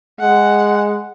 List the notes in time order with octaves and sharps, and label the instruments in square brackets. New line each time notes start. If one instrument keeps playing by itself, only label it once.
[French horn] G#3 [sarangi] F#5